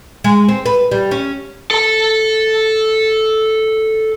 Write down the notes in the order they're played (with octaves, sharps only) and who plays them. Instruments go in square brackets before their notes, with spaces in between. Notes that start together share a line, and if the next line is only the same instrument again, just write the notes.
[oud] G#3
C4
B4
G3
C#4
[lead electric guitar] A4 A5